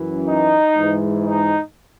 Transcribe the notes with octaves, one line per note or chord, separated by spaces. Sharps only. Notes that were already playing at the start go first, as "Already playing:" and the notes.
Already playing: F#2 E3
D#4
G#2 E3
D#4